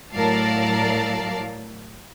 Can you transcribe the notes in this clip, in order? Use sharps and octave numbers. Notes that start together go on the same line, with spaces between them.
A2 F#3 A#4 D5 F5 A5